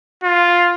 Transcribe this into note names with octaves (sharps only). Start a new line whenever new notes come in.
F4